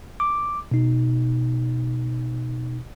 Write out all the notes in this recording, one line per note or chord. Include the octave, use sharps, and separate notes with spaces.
D6
B2 D#4